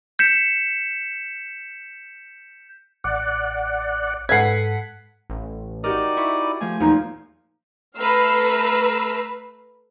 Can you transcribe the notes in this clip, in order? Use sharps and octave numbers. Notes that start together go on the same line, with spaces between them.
G6 B6 C#7 E7
A1 D5 F#5
G#2 A4 B4 F#5 G#6 B6 C7
A1
D#4 F#4 G4 A#4 D5 D#6
E4 C#6
F3 A3 G#5
E2 A#2 F3 D#4
A3 B4 A#5 E6 F6 C7